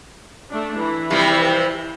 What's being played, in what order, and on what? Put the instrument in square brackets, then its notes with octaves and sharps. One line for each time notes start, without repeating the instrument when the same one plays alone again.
[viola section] A3 D4
E3
[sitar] C3 F3 G3